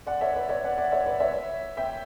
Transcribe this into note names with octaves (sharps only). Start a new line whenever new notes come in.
D5 F#5
C#5 E5
B4 D5
C#5 E5
D5 F#5
D5 F#5
C#5 E5
B4 D5
C#5 E5
E5 G5